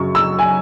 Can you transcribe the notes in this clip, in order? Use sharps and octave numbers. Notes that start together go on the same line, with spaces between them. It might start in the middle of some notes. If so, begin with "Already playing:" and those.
Already playing: F#2 C#3 F#3 C#6
E6
G#5